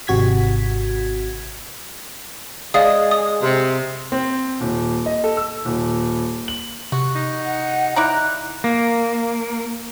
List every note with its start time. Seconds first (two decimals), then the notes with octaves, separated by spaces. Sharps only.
0.07 G#1 C3 F#4 G#6 B6
2.74 G#3 D5 F5 D#6
3.11 D#6
3.42 C3
4.12 C4
4.60 D#1
5.06 D#5
5.24 A4
5.37 E6
5.65 D#1
6.48 F#7
6.92 C3 F#4
7.15 D#4
7.45 F#5
7.96 D#4 E4 D5 A#5 F#6
8.64 A#3